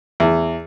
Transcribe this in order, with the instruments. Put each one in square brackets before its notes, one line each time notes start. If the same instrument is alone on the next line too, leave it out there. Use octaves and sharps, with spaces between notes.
[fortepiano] E2